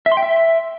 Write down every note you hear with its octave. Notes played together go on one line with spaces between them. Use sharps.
E5
C6
G5
E5